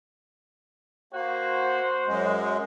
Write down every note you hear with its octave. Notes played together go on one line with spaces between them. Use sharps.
A#3 F#4 C5
F#2 G#3